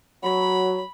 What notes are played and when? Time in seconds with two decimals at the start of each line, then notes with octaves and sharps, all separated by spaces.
0.23 F#3 B5